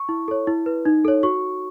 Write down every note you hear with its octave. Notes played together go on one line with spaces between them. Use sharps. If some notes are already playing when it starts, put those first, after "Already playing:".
Already playing: C#6
E4
A4 C#5
E4
B4
D#4
A4 C#5
F#4 C#6